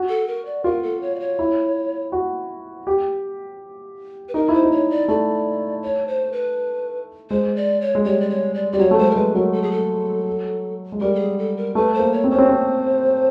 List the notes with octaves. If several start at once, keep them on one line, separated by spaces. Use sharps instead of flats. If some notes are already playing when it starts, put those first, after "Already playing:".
Already playing: F#4
A4
A#4
D5
F4 A#4
A4
C#5
D5
C#5
E4
F#4
G4
B4
D#4 A#4
E4 C5
D#4
C#5
D5
A3 D5
C#5
C5
B4
G#3 C5
D5
C#5
G#3
G3 C#5
D5
C#5
D5
G3 D5
F#3 C#5
A3
G#3 C5
A#4
G#3 B4
F#3 A#4
A4
G#4
A4
G#3
G3 A#4
A4
G#4
A4
A#4
A3 B4
C5
A#3
C#5
C4
C#4 C5
C4
C4